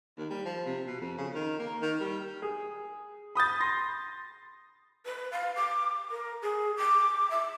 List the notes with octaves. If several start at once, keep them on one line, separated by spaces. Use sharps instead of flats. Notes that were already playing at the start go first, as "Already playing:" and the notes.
D#2
G3
F3
C3
B2
F2
C#3
D#3
A#3
D#3
G3
G#4
B5 D#6 G6 A6
C6 A#6
B4
F5
D6
A#4
G#4
D6
E5